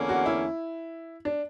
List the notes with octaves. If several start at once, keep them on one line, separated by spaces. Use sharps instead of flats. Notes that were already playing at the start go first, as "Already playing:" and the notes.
Already playing: E2 D3 A#3 C#4
F#4
E4
D4